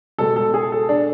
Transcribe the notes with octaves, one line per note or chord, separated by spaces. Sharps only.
B2 G#3 A4
A4
G#4
A4
D4